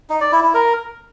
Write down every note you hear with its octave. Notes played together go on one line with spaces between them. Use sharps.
D#4
D5
E4
E4
A#4